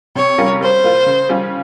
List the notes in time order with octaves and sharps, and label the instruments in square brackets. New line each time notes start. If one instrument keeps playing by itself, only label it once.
[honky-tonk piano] C3 [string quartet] C#5
[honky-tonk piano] G3 C#4 F4 A#4
[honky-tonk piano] G3 [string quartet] C5
[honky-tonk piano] A#3 F4
C#3
G3 C#4 F4